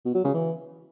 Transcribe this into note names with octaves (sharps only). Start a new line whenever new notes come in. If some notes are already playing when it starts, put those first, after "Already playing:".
B2
F#3
C#3
E3